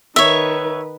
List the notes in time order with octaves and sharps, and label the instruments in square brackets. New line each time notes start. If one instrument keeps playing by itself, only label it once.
[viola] D#3 B4 [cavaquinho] C#5 E5